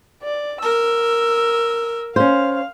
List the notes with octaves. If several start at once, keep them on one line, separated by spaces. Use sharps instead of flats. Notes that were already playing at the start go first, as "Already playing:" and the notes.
D5
A#4 E6
C#4 C5 F5